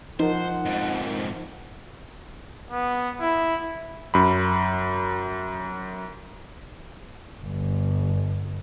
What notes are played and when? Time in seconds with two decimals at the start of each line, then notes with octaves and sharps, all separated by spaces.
0.20 F3 D#4 A#4 C5 F#5
0.65 F2 G#2
2.70 B3
3.21 E4
4.14 F#2 B5
7.43 G1